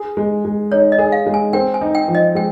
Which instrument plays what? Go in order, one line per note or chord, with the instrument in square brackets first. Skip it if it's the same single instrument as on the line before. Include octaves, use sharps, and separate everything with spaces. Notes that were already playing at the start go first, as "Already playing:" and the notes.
Already playing: [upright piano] G#4
G#3
G#3
[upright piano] D#4 [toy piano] C#5
[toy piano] D#5
[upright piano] G#4
[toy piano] F5
[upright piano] G#3
[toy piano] G#5
[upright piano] C4 [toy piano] G5
[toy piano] G#5
[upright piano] D#4
[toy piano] G5
[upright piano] F3
[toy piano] D#5
[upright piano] G#3 [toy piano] G5